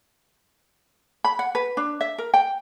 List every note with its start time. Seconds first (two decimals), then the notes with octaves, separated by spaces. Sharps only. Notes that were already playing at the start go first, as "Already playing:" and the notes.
1.24 B5
1.39 F#5
1.55 B4
1.77 D4
2.01 E5
2.18 A#4
2.34 G5